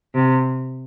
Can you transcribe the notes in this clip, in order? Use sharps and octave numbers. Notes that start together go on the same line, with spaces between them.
C3